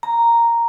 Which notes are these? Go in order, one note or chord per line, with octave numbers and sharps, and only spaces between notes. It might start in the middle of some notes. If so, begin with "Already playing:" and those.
A#5